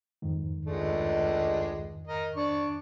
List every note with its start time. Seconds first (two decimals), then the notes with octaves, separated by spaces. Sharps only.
0.22 F2 G#2 D#3
0.65 C#2 G#3 A3 D4
2.07 A#4 D#5
2.36 D4 D5 C#6